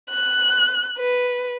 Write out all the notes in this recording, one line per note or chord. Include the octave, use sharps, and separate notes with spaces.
F#6
B4